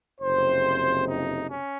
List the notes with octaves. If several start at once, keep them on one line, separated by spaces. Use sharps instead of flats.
F#1 F2 C3 C5
D#4
C#4